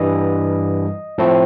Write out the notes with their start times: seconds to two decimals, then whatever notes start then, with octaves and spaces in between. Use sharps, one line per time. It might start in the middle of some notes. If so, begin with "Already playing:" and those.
Already playing: G2 E3 G3 D#5
1.18 A2 F3 A3 C4